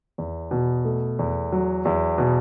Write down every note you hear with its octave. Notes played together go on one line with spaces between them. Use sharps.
E2
B2
A3
E2
F#3
E2
B2